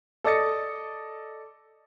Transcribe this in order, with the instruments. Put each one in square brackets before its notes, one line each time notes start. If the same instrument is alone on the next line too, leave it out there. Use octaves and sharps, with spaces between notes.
[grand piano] A4 D5 D#5 A6 C#7